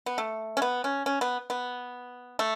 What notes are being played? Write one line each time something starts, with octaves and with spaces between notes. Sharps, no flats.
B3
A3
C#4
B3
C#4
C#4
B3
B3
A3